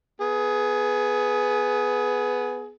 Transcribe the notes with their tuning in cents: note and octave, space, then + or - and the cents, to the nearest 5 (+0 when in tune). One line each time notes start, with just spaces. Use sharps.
B3 +0 G#4 +15